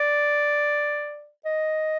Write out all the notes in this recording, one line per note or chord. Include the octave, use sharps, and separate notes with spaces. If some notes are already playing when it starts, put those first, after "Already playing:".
Already playing: D5
D#5